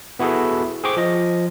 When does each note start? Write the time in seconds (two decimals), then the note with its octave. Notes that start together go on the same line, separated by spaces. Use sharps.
0.19 B3 E4 F#4 G#4 A4
0.84 G#4 C5 G5 C#6 D6
0.97 F3 D#5